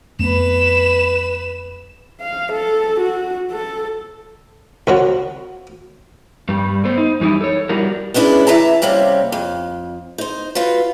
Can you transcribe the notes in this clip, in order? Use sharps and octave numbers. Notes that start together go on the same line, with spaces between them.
F2 A3 B3 B4 E7
F5
A4
F#4
A4
C2 F3 F#3
G2 G3
A3 B3 C5
D#4
F#2 E3 G3 D#4 E4
A4 C#5
G3 D4 E4 F#4 G4 A#4
G#3 B3 C#4 D4 E4
E3 E5 A5 A#5
C3 G3 A#3 C4 C#4
F2
D#4 C5
F4 F#4 B4